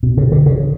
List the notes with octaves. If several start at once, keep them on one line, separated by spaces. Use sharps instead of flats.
B2
C#3
D3
C#3